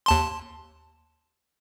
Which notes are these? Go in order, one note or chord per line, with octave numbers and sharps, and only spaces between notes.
D#2 A5 C6